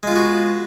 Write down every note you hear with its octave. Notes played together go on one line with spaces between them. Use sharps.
G#3 B3 F4 F#4